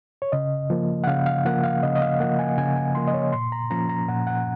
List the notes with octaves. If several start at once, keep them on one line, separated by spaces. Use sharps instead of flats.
C#5
C#3 D#5
F3 A#3
F#5
C#3 F5
F5
F3 A#3 F#5
F5
C#3 D#5
D#5
F5
F3 A#3 F#5
G#5
C#3 G#5
G#5
F3 A#3 C6
D#5
C#5
A#2 C6
A#5
F3 A#3 C#4 A#5
A#5
A#2 F#5
F#5